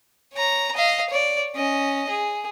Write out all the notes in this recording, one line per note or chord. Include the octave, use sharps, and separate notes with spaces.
C#5 A#5
D#5 F5
C#5 D5
C#4 D#5
G#4